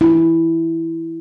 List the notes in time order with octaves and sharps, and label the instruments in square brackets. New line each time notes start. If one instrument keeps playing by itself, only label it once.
[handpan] E4